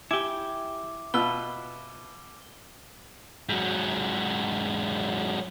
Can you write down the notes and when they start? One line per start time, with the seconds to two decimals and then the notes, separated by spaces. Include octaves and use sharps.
0.11 E4 G4 G#5 D6
1.14 B2 F4 B4 E6 G7
3.49 G#2 F#3